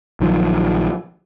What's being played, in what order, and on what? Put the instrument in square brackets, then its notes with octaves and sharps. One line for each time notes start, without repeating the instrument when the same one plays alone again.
[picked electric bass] A#1 D#3 F3 F#3